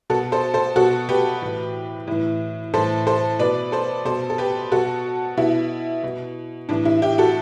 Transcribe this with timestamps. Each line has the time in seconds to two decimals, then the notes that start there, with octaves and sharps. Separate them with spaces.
0.10 B2 F#4 A4
0.32 A4 C5
0.54 A4 C5
0.76 B2 F#4 A4
1.09 G4 B4
1.42 A2 E3
2.08 A2 E3
2.74 A2 E3 A4 C5
3.07 A4 C5
3.39 B2 B4 D5
3.72 A4 C5
4.05 B2 A4 C5
4.30 A4
4.38 G4 B4
4.72 B2 F#4 A4
5.37 B2 E4
6.03 B2
6.69 A2 E3 D4
6.85 E4
7.02 E4 G4
7.18 F#4 A4